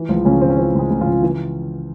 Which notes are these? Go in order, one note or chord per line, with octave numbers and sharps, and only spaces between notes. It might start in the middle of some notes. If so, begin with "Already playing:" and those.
Already playing: E3
C#2 F3 F4
C#2 C#3 C#4
C#3 C4
C#4
E3 C4
C#2 G#3 G#4
C#2
F3 F4
C#3
E3